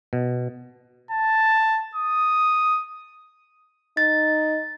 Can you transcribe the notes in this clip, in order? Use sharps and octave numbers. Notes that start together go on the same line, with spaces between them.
B2
A5
D#6
D#4 A6